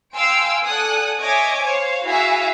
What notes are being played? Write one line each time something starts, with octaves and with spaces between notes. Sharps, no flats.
F5 G5 G#5 C6 E6 D7
A4 D5 F#5 G#5 D#6 F#6
C#5 D#5 E5 G#5 D6 G#6
C5 C#5 F5
E4 F#4 G#4 E5 F5 G#5